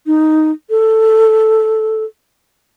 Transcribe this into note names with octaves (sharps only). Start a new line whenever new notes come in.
D#4
A4